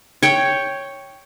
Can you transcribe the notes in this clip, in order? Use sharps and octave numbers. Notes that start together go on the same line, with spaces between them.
C#5 G5